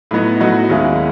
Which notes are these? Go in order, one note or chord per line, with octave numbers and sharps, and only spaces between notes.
A2 F#3 B3 D#4 F#4
A2 F#3 B3 D#4 F#4
D#2 D#3 G#3 C#4 E4